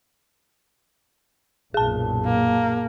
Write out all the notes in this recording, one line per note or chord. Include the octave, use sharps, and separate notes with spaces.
B1 F#2 A#2 G#4 A5
A#3